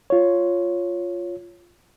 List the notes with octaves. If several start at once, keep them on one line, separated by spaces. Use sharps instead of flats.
F4 C#5